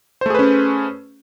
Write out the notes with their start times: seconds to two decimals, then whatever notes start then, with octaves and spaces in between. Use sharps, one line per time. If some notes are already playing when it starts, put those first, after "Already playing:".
0.21 C5
0.26 A3
0.30 G#4
0.35 B4
0.39 C#4